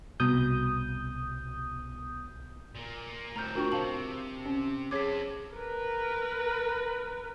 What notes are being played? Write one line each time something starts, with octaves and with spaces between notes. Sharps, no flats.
C2 B2 D#6 G6
A#2 A#3
A2 C4 A#5 F6 G6
D4 F4 F#4 A#4 G5 C#6
C3 C5 F5 A5 F#7
C#4
C4 G#4 A4 C#5 D6 G#6 B6
A#4 B4